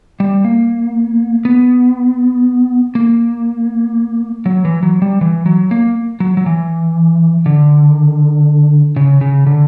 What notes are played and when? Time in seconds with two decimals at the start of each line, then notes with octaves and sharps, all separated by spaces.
0.20 G3
0.44 A#3
1.45 B3
2.95 A#3
4.46 F#3
4.65 E3
4.83 F#3
5.02 G3
5.21 E3
5.46 F#3
5.71 A#3
6.20 F#3
6.37 F#3
6.46 E3
7.46 D3
8.96 C#3
9.21 C#3
9.47 D3